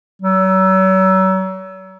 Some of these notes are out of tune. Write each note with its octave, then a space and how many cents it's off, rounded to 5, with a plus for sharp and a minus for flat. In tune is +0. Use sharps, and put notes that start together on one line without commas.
F#3 +35